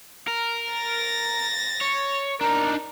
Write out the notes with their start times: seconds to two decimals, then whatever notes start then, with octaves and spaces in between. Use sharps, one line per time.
0.27 A#4
0.73 A6 A#6
1.81 C#5
2.41 D4 D#4 A#4